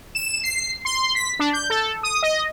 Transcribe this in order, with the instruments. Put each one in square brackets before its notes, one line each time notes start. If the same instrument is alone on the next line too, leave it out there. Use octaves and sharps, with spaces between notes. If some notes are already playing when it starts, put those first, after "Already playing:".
[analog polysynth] E7
C7
C6
B6
D4
G6
A4
D#6
D#5